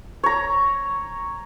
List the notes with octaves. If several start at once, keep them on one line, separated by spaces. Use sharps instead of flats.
C#5 A#5